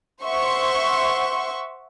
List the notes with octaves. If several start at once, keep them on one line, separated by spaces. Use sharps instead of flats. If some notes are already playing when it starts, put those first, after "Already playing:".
C5 E5 F#5 C6 C#6